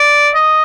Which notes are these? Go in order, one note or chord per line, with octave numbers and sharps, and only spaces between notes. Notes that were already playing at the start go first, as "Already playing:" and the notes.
Already playing: D5
D#5